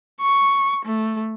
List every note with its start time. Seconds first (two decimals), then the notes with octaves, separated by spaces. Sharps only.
0.20 C#6
0.85 A3